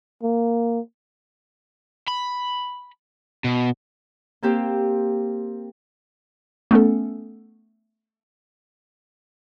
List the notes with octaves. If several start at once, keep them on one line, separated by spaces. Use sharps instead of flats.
A#3
B5
B2
A#3 C4 G4 C5
A3 B3 C#4 A4